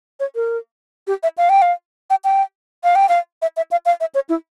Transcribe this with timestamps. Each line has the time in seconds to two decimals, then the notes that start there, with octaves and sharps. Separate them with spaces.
0.20 C#5
0.35 A#4
1.07 G4
1.23 E5
1.38 F5
1.49 G5
1.62 F5
2.10 G5
2.24 G5
2.84 F5
2.95 G5
3.09 F5
3.42 E5
3.57 E5
3.71 F5
3.85 F5
4.00 E5
4.15 C#5
4.29 E4